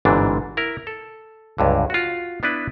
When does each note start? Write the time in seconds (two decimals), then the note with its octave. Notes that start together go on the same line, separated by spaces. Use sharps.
0.05 G1 G#2 C3 E3 D4
0.57 E4 A#4
0.87 A4
1.58 C#2 G2 D3
1.90 F4 F#4
2.43 B3 D4 E4 B4